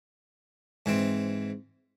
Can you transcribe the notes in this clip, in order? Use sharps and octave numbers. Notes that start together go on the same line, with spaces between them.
G#2 E3 C4